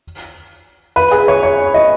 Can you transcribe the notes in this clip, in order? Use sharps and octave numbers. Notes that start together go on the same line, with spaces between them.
B4
G#4
C#5
C#5
D#5